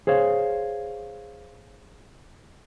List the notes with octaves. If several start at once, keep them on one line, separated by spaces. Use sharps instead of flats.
G#4 C5 C#5 F5